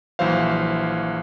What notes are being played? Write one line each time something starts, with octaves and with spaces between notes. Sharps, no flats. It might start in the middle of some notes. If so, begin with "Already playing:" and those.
A#1 E3 F#3 C5 F5